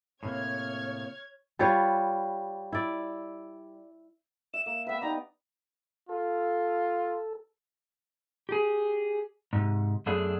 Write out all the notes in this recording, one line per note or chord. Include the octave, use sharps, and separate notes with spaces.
A2 C3 A#3 C#5 F6 G#6
G3 F4 B4 C#5
E4 D5
E5 E7
A#3 E7
B3 B4 E5
D#4 G4 D5 A#5
F4 A4
G4 G#4
G#2 C3
F#2 A3 B3 D4 G#4 C#5